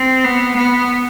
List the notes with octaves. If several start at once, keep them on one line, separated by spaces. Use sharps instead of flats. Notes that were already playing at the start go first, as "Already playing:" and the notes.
Already playing: C4
B3
B3